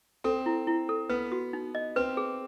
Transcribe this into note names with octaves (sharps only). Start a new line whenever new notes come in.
C4 A4
E4
E4
A4
B3 B4
F#4
D#4
D#5
C4 B4
G#4